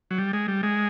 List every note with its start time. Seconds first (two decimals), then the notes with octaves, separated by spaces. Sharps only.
0.11 F#3
0.18 G3
0.33 G#3
0.48 G3
0.63 G#3